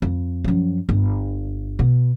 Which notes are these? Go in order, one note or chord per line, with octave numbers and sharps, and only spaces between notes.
F2
F#2 F3
G1
B2